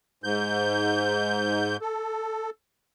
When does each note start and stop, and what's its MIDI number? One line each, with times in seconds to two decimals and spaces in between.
0.24 1.77 44
0.24 1.77 91
1.81 2.50 69